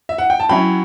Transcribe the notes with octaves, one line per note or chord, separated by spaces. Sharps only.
E5
F#5
G5
A5
F#3 C#4 E4 G5 B5